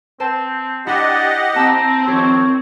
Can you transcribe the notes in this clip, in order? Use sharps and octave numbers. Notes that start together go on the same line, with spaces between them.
C4 C5 G5 A5
D4 E4 G4 D#5 F#5
C4 A5 A#5 E6
D#3 F3 G4 C#5